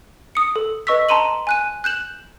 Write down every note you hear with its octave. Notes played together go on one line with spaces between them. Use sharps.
D#6 C#7
A4
B4 D#5 C#6 E6 B6
A5 A#5 C6 D#7 F#7
G#5 F#6 D#7
F#6 G6 E7 F#7